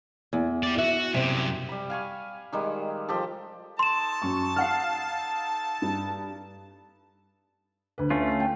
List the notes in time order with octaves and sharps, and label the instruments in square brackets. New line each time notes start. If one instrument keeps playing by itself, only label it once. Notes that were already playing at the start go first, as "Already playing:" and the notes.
[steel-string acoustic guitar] E2
[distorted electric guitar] G4 D5
[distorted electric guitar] F#4 [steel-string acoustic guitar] E5
[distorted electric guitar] F#2 G3 [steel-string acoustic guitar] C3
[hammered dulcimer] G3 B5
F5 G#5 C#6
D#3 G3 G#3
F3 G4 A4
[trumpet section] D#4 A4 A5 [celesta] C6 E7
[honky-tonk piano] F#2 C#6
F5 F#5 F6
G2
[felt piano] D2 B4
[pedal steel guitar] A3 C#4 F4
[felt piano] G5